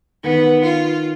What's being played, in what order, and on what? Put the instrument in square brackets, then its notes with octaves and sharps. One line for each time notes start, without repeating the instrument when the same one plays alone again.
[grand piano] D#3 [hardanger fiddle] B3
[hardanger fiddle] F4